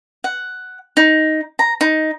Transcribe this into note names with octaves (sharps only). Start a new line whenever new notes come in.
F#5
D#4
A#5
D#4